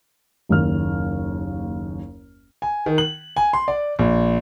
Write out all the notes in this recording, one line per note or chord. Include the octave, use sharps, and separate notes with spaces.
F#1 D#2 F6
G#5
D#3
F#7
G#5
C6
D5
A#1